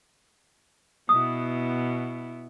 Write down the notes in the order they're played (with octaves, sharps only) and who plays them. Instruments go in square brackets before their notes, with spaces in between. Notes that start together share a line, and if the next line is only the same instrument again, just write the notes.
[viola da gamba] B2 B3 E4 [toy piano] D#6